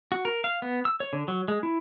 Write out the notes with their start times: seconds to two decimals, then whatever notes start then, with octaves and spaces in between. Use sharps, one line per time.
0.12 F#4
0.25 A#4
0.44 F5
0.62 B3
0.85 E6
1.00 C#5
1.13 D3
1.28 F#3
1.48 G#3
1.63 E4